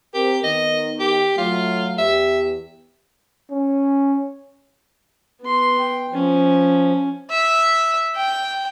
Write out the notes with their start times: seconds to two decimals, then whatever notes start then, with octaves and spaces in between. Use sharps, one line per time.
0.14 C4 G4 A#4
0.44 D#3 B3 D#5
1.00 G4
1.38 F#3 A3 F4
1.98 E2 G4 E5
3.51 C#4
5.41 B3 C6
5.79 G5
6.13 F3 C#4
7.31 E5
8.15 G5